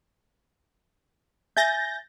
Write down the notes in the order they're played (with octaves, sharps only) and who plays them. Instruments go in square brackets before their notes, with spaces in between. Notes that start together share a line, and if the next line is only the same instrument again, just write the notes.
[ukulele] E5 G#5 [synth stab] G6 A6 A#6